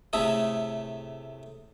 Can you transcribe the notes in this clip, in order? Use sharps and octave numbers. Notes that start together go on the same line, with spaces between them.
A2 C3 A3 G#4 A4